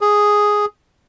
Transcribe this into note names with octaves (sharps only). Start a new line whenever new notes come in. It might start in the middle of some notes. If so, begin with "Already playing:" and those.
G#4